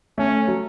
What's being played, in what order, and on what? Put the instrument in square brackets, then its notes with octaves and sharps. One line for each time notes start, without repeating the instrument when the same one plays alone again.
[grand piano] A3 [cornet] C#4
[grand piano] F#3